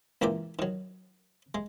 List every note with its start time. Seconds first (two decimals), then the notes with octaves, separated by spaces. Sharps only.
0.22 C#2 A#2 E3 A#4 D5 G5
0.59 D#3 F#3
1.55 G#3